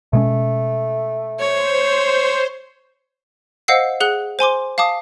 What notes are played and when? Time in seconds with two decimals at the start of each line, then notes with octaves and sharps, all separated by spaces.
0.13 B2 G#3 A3 C#4
1.40 C5 C#5
3.68 C5 D#5 F5 F#5 E6 C7
4.00 G#4 F#5 F#6 G7
4.39 C5 G#5 C6 D6
4.78 F5 A5 D6 D#6